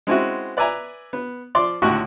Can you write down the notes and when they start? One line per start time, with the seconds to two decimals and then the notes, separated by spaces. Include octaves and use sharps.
0.07 G#3 C4 C#4 E4 F#4
0.57 B4 D5 E5 G#5 A#5
1.13 B3
1.55 F3 D5 C6 D6
1.82 C#2 A2 D3 F#4 G4 C#6